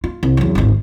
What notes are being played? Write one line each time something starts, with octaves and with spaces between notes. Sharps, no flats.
F4
C2
E2 F#3
D1 G#1